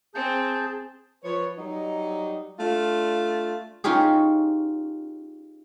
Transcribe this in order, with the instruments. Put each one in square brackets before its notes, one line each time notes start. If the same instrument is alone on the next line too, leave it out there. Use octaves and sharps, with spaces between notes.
[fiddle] C4 [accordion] G#4 A5 G6
[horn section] F3 B4 C#5
F#3 G3 D#4
A3 D4 F4
[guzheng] C#4 D#4 F4 G4 G#4